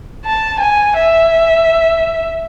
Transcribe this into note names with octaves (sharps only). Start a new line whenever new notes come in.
A5
G#5
E5